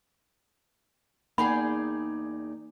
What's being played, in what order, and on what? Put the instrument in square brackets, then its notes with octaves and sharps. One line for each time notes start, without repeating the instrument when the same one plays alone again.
[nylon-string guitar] E2 D#4 F#5 [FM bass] A#3 [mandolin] G#4 D5 G5 [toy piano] B5